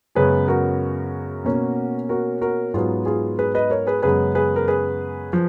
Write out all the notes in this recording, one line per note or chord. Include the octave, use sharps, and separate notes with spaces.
F#2 C#3 G#3 B3 G#4 B4
F#4 A#4
B2 A#3 C#4
F#4 A#4
F#4 A#4
G#2 F#3 B3 F4 G#4
F4 G#4
G#4 B4
B4 D#5
A#4 C#5
G#4 B4
F#2 C#3 G#3 B3 G#4 B4
G#4 B4
A#4
G#4 B4
F3